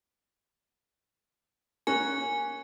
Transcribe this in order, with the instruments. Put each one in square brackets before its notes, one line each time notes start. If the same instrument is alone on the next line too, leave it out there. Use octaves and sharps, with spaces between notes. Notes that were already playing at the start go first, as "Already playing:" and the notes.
[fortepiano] A#3 C#4 F#6 [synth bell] G#5